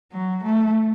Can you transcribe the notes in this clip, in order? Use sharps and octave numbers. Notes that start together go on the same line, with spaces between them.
F#3
A3